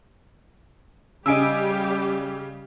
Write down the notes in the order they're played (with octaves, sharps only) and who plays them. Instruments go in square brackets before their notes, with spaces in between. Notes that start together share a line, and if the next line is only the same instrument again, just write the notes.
[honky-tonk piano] C#3 D7 [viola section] G3 G4 [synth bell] D#5 G#5 E6